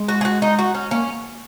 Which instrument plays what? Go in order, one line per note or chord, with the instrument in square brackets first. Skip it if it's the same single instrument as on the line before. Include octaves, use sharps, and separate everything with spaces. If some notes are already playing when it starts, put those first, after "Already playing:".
Already playing: [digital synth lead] G#3
[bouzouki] F#4
G#4
F#4
D#4
F#4
C#4
[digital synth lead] A#3 [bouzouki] C#4